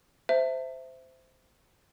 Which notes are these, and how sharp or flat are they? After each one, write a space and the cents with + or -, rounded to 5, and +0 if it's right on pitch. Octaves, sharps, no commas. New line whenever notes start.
C5 -15 E5 +5 A5 +45